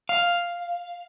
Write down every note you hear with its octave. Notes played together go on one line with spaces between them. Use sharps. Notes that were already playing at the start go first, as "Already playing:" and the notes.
F5